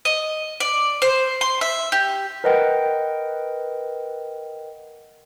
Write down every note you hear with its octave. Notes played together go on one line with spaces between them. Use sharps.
D#5
D5
C5
C6
E5
G4
A#4 B4 D#5 F#5 G5